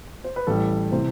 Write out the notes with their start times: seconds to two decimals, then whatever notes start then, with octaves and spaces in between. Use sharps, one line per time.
0.24 C5
0.36 B4
0.47 A1 A2 G3 A4
0.92 C3 E3 C5